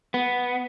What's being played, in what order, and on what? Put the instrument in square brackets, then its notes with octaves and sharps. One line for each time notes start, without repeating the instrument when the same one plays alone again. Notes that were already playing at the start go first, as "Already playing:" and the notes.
[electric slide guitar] B3